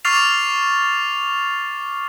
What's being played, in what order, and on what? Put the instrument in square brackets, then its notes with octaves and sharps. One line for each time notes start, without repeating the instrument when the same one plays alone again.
[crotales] C#6 D6 F6 A6 C7 F7